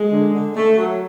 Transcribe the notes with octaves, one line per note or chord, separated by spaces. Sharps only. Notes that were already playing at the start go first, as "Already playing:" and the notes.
Already playing: G#3
D3
D3
A3
F#3